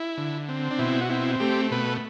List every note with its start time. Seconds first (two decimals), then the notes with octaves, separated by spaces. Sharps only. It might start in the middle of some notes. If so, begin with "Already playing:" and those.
Already playing: E4
0.17 D3
0.49 C4
0.71 D4
0.79 B2 E4
1.01 F#4
1.10 C4 E4
1.40 A3 G4
1.71 B2 B4